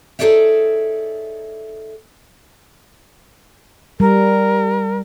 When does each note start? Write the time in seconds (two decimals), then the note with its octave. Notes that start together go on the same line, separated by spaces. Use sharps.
0.19 D#4 G#4 A4 C#5 D5 E5
4.00 G3 A#4